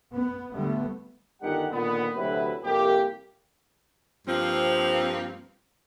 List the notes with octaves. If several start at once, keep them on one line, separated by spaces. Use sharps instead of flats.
B3
D3 G3 A3 B3
G1 D#3 G3 G4 F#5
A#2 D3 D#3 B3
D2 C3 F#3 E4 B4
C2 F2 A#3 G4
G2 F3 A#3 C4